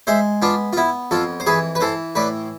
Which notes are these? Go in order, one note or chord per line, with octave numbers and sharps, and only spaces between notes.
G#3 C5 E5
B3 D4 F4
F4
B3 E4
F2 F4 A4
C5
E3 G#4 B4
B4
E3 A4 C5
A2 B4 D5